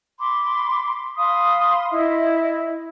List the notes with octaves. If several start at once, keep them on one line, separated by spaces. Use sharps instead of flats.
B5 C6 D6
F5 B5 C6 D#6
E4 D#5 E5